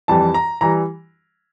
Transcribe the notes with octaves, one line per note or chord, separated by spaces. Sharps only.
F2 E3 G3 A5
A#5
E3 G3 A#5